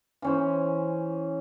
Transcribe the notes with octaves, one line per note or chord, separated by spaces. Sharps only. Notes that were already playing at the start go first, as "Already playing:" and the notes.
E3 C#4 C5